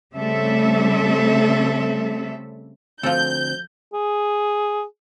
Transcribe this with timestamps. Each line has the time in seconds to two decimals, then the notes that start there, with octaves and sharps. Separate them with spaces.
0.14 C#3 G3 A3 C4 A4 E5
3.03 D2 F3 C4 A4 G6
3.93 G#4